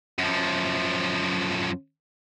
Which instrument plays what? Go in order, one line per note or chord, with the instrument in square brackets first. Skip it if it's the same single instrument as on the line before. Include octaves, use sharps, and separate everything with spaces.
[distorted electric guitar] F#2 F3